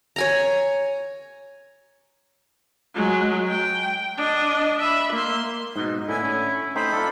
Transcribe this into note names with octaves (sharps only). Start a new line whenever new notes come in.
C#5 G#5 A#5
F#3 G#3
G5
D4 D#5
E5 B5
A#3 C6
G#2 B2 D#4
A2 D3 E4 G#5
C#4
A3 C4 D#4 C5 B5
D4 F4 A4